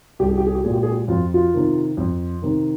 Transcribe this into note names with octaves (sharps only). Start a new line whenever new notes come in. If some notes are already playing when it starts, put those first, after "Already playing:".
C2 G4
G#4
G4
G#4
G4
A#2 G#3 G#4
G4
G#4
G4
F2 F4
F4
C3 D#3
F2
C3 D#3